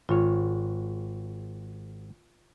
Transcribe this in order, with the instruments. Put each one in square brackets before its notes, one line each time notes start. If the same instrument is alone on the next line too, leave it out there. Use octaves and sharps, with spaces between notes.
[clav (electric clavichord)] G#1 C#5 [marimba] F4